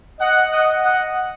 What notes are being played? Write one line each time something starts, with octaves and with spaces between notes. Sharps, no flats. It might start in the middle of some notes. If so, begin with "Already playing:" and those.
D#5 F#5
D#5 F#5
D#5 F#5